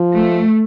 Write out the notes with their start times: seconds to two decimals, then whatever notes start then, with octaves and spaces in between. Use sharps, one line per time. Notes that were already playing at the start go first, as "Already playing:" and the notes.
Already playing: F3
0.12 A3